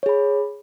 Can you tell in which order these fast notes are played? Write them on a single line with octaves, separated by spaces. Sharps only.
C#5 G#4 B5